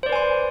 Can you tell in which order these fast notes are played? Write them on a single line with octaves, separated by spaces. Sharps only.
C5 D5 B4 G#5 C6